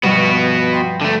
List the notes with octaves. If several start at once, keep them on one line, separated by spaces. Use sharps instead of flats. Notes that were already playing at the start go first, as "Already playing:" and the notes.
G2 B2 F3 B3 F#4
G5 C6
D3 A3